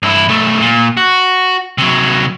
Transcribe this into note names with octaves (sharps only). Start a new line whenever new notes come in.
G2 E4
B1 A3
A#2
F#4
C3 F#3